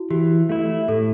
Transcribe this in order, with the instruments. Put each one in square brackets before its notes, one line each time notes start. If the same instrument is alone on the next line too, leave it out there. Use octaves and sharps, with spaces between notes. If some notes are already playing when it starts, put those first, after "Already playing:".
Already playing: [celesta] E4 F#4
[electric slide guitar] E3 [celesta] G4
[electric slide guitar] A3 E4
[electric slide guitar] A2 [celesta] A4